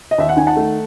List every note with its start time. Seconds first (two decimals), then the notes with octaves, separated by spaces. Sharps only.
0.11 D#5
0.18 D#2 E5
0.29 F#5
0.37 D#3 G#5
0.47 F#5 A5
0.57 A3